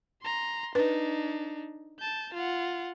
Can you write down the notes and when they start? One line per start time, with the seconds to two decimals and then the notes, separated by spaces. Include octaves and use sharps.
0.22 A#5 C6
0.75 D4 D#4 B4
1.99 A5 G6
2.34 F4 F#5